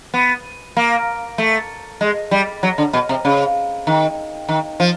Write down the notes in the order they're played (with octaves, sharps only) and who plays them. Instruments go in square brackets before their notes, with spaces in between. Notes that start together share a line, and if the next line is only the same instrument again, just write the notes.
[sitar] B3
A#3
A3
G#3
G3
F#3
D3
B2
C3
C#3
D#3
D#3
F3